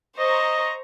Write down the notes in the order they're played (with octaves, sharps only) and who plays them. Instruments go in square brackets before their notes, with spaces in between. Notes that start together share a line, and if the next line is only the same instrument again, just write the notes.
[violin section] C5 A#5 C#6 [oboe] D#5